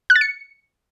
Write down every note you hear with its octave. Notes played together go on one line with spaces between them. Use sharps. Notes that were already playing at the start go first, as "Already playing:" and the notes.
F#6
A6
C#7